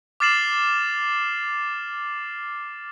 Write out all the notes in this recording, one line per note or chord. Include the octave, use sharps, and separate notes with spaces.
D6 F6 A6 C7 E7 F#7